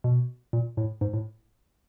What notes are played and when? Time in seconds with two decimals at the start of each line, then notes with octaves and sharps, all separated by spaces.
0.04 B2
0.53 A#2
0.77 A2
1.01 G#2
1.14 A2